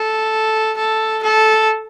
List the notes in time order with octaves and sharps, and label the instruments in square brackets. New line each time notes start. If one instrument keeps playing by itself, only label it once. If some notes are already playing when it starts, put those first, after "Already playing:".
Already playing: [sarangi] A4
A4
A4